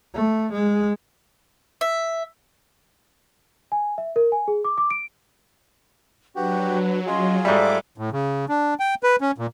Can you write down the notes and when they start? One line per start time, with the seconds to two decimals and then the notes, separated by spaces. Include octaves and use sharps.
0.14 A3
0.52 G#3
1.81 E5
3.72 G#5
3.98 E5
4.16 A#4
4.32 G#5
4.48 G#4
4.65 D6
4.78 D6
4.91 D7
6.36 F#3 D4 F#4 G4 B4
7.06 C#4 F4 G#4 D#5 C6
7.45 G#2 G3 A4 D5 E5 D6
7.98 A2
8.12 C#3
8.49 D4
8.79 G5
9.03 B4
9.21 C#4
9.38 A#2